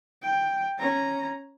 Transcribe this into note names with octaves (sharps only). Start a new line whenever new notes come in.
G5
C#4 A#5